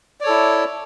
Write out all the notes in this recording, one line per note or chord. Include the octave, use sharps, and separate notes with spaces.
E4 A4 C#5 D5